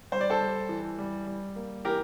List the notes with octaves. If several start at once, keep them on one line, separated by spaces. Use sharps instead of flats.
G3 C5
D5
A4 C5
G3
E3
G3
G3
A#3
E3 G4 A#4